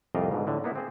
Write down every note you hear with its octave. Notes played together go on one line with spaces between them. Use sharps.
C2 F2 A3 D5 D#5 F5
G#2 B2 D3
A2 D3
A#3 B3 D#4 E4
C4 G#4 C5